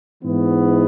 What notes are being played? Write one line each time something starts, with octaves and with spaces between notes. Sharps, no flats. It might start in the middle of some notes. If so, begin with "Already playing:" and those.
G#2 E3 B3